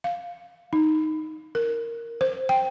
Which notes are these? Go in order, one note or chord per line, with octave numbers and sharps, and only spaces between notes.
F5
D#4
A#4
C5
G5